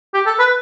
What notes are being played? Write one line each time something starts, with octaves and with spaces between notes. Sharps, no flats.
G4
A4
B4